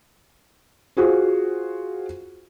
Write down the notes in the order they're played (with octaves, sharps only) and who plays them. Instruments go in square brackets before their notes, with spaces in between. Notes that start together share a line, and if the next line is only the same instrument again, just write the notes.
[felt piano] F4 F#4 G#4 C5